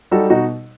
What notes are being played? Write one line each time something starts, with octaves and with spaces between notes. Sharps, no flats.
G3 D#4 F#4 A4
B2 D#4 F#4